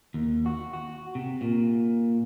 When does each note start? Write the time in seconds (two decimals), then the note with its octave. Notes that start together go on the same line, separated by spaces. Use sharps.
0.14 D#2
0.46 F#4
0.73 F#4
1.15 C3
1.41 A#2